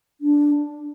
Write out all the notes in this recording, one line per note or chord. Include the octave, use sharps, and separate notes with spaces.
D4